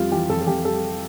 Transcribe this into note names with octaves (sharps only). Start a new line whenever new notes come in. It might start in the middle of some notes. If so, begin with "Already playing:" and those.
Already playing: F2 C3 G3 F4
E3 G4
F2 A4
A4
F2 G4
G3 A4